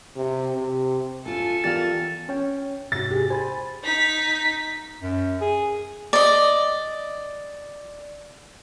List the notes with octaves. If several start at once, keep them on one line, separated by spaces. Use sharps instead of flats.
C3
C3
F#2 F4 A4 G#5 A5
E2 F4 G4 A#4 D5 A6
C#4 C#5 G5
G#2 C3 F#4 A6
G4 G#4
C5 G#5 B5 A6
D#4 B6
F#2
G#4
D5 D#5